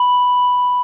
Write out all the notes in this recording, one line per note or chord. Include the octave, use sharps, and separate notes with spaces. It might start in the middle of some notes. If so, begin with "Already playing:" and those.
Already playing: B5